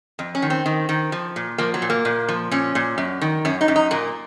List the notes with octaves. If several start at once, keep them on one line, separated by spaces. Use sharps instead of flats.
F2
C#4
D#3
C4
D#3
D#3
F3
A#2
F3 A#3
F#3
A#2
A#3
A#2
F3
A#2 C#4
A#2
F#2
D#3
F#2 C#4
D#4
F#2
D#4
A#2 A#3